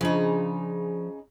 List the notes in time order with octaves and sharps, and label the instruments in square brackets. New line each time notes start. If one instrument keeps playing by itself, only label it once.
[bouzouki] C#3 D#4 [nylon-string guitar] F3 D4